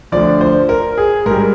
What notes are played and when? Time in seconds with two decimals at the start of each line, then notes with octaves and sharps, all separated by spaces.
0.12 D2 D3 F3 D5
0.41 C5
0.69 A#4
0.98 G#4
1.26 G#2 A#4
1.31 G3